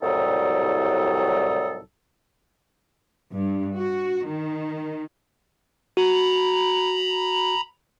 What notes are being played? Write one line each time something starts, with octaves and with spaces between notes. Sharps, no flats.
C2 A2 F#3 G3 D#4 A4
G2
F#4
D#3
F#4 A#5 B5